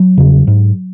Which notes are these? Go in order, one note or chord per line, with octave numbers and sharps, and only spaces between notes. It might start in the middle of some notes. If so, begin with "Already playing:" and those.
Already playing: F#3
E2 C#3
G#2